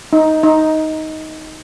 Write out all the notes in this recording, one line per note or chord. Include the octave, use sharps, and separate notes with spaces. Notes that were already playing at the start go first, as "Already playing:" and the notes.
D#4
D#4